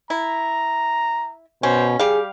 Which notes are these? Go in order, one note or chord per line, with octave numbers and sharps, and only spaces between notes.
E4 A#5
B2 C#4 C5
G3 G4 G#4 F5